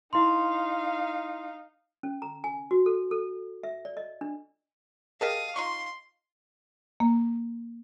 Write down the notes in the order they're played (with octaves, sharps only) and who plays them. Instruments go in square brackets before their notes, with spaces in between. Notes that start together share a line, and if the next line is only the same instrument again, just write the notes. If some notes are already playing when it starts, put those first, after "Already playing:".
[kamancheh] D#4 F5 [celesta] E4 C6
[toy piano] C#4
A#5
G#5
F#4
A4
A4
E5
D5
D#5
D4
[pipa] G4 D#5 A5 [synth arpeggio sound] G#4 A#4 [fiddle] F5 D#6
[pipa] D#4 F4 C#6 [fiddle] C6
[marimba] A#3